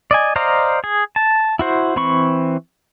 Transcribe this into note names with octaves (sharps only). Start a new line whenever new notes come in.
D5 D#5 G#5
C5 D5 D#5 F5 A#5
G#4
A5
E4 F#4 C5
E3 C4 B5 C#6